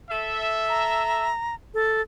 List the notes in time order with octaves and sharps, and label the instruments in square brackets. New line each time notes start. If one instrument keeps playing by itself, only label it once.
[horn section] A4 E5
[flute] A#5
A4